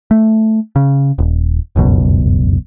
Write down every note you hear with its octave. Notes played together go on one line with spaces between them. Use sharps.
A3
C#3
D#1
F1 C#2 F#2 B2